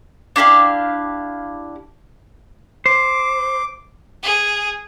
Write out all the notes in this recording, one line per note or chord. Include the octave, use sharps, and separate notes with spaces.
D4 E4 G4 F5
C5 D6
G#4